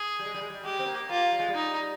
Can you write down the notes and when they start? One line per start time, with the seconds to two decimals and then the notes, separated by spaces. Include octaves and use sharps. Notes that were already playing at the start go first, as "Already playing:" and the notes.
Already playing: G#4
0.19 G3
0.26 G#3
0.34 G3
0.41 G#3
0.50 G3
0.64 G#3 G4
0.79 C4
0.86 A#3
1.09 A#3 F4
1.32 G3
1.39 G#3
1.48 G3
1.55 D#4